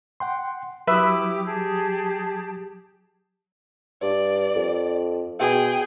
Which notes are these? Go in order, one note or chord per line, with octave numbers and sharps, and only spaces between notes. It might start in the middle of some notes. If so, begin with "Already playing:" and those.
F#5 G5 C6
F#3 E4 G4 B4 E5 D6 D#6
G4 G#4 A5
G2 D5
F2
B2 G#4 G5